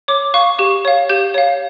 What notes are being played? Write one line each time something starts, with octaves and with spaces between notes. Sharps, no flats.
C#5 D6
F5 C#6
G4 C#6
C#5 F5
G4 G6
C#5 F5